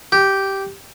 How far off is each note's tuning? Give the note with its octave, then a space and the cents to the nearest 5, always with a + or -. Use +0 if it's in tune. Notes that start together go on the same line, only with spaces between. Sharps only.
G4 -10